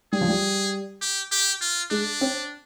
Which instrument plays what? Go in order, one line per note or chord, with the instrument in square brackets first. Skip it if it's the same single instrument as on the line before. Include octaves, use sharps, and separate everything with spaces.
[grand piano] G3 [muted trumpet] G#4
[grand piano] F3
G3
[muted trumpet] G4
G4
F4
[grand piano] G#3 [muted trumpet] D4
[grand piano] C4